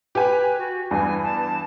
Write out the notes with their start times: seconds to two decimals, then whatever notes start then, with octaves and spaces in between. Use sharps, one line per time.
0.15 G4 B4 G#5
0.58 F#4
0.91 E2 G2 G#5
1.23 A5